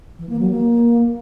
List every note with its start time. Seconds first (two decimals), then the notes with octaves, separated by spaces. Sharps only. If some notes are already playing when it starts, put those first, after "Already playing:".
0.19 E3
0.29 A#3
0.39 F#3
0.50 A#3